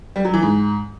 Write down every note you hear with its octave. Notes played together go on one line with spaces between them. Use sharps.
G3
F#3
E3
G#2